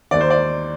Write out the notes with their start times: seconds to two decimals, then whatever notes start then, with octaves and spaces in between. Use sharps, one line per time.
0.11 D#2 D#3 D5
0.21 C5
0.30 D5